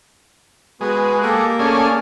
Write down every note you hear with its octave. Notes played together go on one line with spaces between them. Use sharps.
G#3 B3 F#4 B4
A#3 G4 A4
A3 C#4 G#4 D5 F6